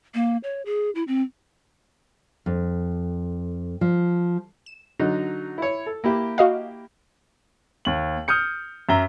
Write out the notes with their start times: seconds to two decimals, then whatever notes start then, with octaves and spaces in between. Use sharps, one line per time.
0.14 A#3
0.43 C#5
0.66 G#4
0.95 E4
1.08 C4
2.46 F2
3.81 F3
4.66 E7
4.99 D3 F#3 D#4
5.58 E4 C#5
5.86 A4
6.04 A#3 E4 G4
6.38 F#4 D#5 F5
7.85 D#2 F#7
8.28 D#6 F6 G6 C#7
8.89 F#2 E5 A#5 G7